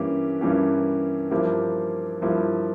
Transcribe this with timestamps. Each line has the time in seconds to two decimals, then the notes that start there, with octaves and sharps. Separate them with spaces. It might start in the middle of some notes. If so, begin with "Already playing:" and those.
Already playing: G2 E3 A#3 C#4 G4
0.41 G2 E3 A#3 C#4 G4
1.31 G2 F3 A#3 E4 G4
2.22 G2 F3 A#3 E4 G4